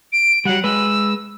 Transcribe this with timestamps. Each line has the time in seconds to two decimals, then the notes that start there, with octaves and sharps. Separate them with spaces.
0.13 D7
0.45 F#3 G3 F#5
0.64 G#3 B4 E6